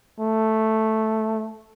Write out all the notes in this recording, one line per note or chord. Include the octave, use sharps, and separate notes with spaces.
A3